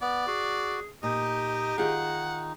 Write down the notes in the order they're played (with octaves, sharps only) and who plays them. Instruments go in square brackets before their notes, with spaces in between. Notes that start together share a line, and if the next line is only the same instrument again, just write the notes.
[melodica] B3 [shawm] D5
[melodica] F#4 [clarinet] G#4
[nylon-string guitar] A#2 [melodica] D#4 [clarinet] G4 [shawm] D#5
[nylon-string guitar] D#3 F4 G#4 [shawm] F#5